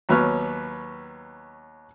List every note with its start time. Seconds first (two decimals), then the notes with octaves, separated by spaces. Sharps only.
0.09 D#2 F#3 B3 B4 C#5 F6